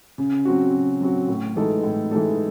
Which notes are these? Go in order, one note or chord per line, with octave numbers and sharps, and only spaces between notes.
C#3
F#3 C4 F#4
C#3
F#3 C4 F#4
A2
E3 G#3 D#4 A4
A2
E3 G#3 D#4 A4